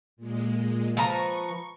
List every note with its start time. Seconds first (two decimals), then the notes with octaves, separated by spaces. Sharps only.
0.17 A#2 G#3
0.97 F3 B4 A#5 C#6